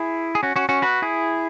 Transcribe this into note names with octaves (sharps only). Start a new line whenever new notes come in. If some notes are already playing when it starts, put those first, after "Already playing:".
Already playing: E4 G#4
G#4
C#4 F#4
C#4 F#4
C#4 F#4
F#4 B4
E4 G#4